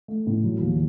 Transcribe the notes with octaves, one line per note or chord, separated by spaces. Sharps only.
A3
A2
F#3
D#2